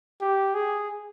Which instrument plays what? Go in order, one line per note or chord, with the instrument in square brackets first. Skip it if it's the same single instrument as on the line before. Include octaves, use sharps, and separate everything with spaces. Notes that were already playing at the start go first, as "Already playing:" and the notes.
[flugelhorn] G4
G#4